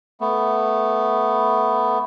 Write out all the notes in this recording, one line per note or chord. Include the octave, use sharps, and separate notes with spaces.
A3 B3